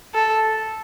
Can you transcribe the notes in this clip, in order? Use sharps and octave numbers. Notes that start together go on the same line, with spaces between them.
A4